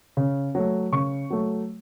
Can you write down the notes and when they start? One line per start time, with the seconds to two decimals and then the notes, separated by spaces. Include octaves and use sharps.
0.17 C#3
0.55 F#3 A3
0.92 C#3 C#6
1.30 F#3 A3